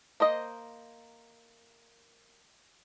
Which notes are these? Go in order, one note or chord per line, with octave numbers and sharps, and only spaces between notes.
A#3 C5 D#5